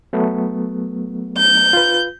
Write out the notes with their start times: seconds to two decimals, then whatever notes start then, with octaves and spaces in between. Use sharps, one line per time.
0.13 F#3 A3 B3
1.38 G6
1.73 F4 B4